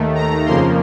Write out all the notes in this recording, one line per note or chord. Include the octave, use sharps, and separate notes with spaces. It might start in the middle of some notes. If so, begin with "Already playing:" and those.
Already playing: D#2 D#3 A3
A#5
F2 C#3 F3 A#3 C6